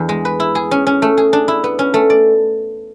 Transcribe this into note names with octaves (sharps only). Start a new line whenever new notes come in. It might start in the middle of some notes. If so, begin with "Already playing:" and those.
Already playing: E2 D4
G#3
B4
E4
G#4
C#4
C#4
A3
G#4
D4
E4
B3
C#4
A3
D5